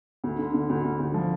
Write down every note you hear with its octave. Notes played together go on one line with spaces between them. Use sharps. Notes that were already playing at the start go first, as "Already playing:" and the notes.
D2
D3
D3
D2
D2
D2
F3